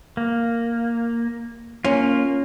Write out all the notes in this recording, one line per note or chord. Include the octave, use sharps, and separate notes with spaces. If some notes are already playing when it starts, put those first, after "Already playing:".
A#3
A#3 C#4 F4